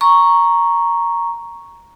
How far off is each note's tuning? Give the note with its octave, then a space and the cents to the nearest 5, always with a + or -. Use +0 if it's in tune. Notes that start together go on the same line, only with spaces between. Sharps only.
A#5 +0 C#6 +0